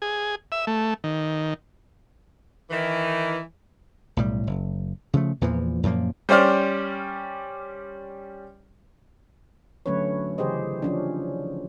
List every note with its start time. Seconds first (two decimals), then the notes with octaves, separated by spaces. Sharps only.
0.02 G#4
0.52 E5
0.67 A3
1.04 D#3
2.70 D#3 E3
4.17 B1 A2 G3
4.47 F#1
5.13 C#3 F3 A3
5.41 E2 A#2 E3 F3
5.83 F#2 A#2 F3 A#3
6.29 G3 C#4 C5 D5 F6
9.86 D3 F#3 A3 C#4 B4 C#5
10.38 C#3 E3 G4 G#4 C5 D#5
10.82 F3 C#4 D4